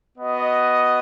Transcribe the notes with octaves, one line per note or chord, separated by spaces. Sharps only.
B3 F#4 D#5